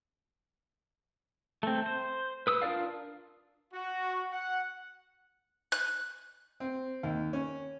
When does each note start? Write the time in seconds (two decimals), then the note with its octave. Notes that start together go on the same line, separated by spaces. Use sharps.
1.63 A3 C4
1.86 C5
2.47 B4 D#6 E6
2.62 D4 F4 A#4 D5 F5
3.74 F#4
4.33 F#5
5.72 F#6
6.60 C4
7.03 D#2
7.33 C#4